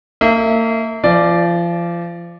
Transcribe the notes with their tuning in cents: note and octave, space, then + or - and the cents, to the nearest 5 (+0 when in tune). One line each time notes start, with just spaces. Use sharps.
A#3 -40 E5 -25
F3 -30 D5 +0